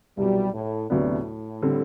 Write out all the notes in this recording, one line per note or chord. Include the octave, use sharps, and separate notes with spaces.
C2 B2 F#3 G3
A2
D2 A2 C3 F#3 B3 D4
D3 G3 C4